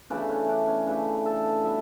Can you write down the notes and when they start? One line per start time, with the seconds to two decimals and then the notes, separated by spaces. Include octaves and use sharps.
0.10 C#3 E3 A3 D4
0.29 C#4
0.49 D4
0.68 C#4
0.87 C#3 E3 A3 D4
1.26 A4
1.64 B2 G3 B3 E5